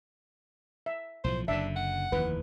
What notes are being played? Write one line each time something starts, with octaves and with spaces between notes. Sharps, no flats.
E5
B1 A2 F3 C5
F#1 F#2 D3 D4 E5
F#5
F1 D#2 E3 B4